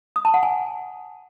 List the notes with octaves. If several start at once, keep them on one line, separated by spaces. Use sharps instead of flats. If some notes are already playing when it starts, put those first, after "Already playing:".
D#6
A5
F#5
G#5